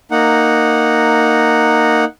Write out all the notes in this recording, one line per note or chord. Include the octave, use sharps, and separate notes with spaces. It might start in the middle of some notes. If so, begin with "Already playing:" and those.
A#3 D#4 F#5